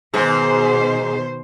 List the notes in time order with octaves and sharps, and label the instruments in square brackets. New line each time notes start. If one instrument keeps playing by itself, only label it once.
[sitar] G#2 G#4 [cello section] B2 D#3 C5